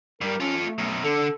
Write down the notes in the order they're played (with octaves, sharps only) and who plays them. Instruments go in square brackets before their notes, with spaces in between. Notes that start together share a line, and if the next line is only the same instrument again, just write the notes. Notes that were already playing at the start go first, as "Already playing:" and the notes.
[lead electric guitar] G2 G3 [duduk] A#4
[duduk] C#4 [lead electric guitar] F4 A4
[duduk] A3
[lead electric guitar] F#2 B2
[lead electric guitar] D3 [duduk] A4